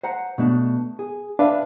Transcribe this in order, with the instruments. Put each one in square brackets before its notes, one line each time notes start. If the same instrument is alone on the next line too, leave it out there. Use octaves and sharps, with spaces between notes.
[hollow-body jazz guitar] C5 F#5 A#5
B2 A3 D4
G#4
[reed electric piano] D4 B4 E5 [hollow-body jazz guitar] F5